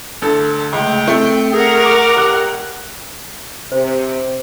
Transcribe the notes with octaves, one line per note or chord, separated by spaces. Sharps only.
D2 A4
C#2 A3 G5
A3 C4
G#4 A#4 F#5
D6
F1 G4 F#6
C3 C5